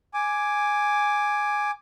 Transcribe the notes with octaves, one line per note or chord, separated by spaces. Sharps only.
G#5 D6